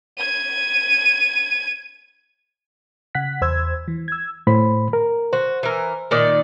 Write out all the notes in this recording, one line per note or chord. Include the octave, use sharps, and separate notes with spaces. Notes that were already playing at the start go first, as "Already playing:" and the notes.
G#6 D#7
C#3 F#5 F#6 B6
E2 C5 E6 G#6
E3
E6 G#6
A2 C5 B5
A#4
F#4 C5
E3 A#4
A#2 D#3 D5